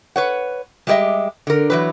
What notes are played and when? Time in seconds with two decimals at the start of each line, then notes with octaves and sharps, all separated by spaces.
0.16 B4 C#5 F#5
0.87 G3 G#3 G4 C#5 D#5 E5
1.47 D3 A#4
1.70 E3 F#3 B4